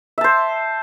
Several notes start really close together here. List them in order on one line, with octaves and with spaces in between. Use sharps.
E5 A5 C5